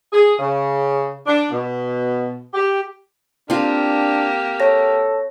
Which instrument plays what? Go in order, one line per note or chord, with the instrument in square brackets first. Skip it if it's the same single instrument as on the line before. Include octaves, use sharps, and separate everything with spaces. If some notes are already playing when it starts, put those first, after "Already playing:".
[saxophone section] G#4
C#3
D4
B2
G4
[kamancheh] A#3 G4 [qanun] C4 F4 [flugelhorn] D4
[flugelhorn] A4 [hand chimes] C#5 A#6